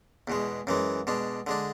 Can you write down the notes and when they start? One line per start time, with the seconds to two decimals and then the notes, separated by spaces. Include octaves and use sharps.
0.28 E2 B2 G#3
0.67 F#2 E3 G#3
1.07 B2 G#3 D4
1.47 D3 G#3 D4